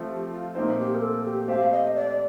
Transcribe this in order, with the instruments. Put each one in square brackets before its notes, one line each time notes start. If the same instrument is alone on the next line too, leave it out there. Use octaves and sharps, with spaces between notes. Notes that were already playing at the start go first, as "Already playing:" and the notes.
Already playing: [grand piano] F3 A3 C4
[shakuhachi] G4
F4
[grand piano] A#2 A3 C4 [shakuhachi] D#4
[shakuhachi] G4
A#4
A4
G4
[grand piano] A3 C4 G4 C5 [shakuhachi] F5
[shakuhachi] D#5
D5